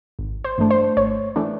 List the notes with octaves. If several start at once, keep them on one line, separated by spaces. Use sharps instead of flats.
G#1
C5
G2 E3 A3 D4
C5
G#1 C#5
E3 A3 D4